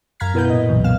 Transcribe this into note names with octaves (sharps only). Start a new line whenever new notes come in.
F#2 F5 A#5 F6 G#6 B6
B2 E4 A#4 B4 F#5 G6
A#2 D#5
C2 F#2 B2 E3 F#3
F#2 B3 F5 F6 E7